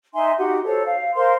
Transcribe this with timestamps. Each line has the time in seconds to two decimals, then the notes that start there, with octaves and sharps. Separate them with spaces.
0.14 D#4 E5 G#5 C6
0.38 D#4 F#4 G4 F#5
0.64 F#4 A4 C5 C#5
0.85 F5
1.15 A#4 C5 F5 C6